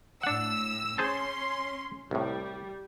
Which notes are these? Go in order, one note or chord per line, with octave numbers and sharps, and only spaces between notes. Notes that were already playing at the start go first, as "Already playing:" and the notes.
A2 D4 F#5 E6
C#4 G#4 C5 A5 C6
C2 A2 G3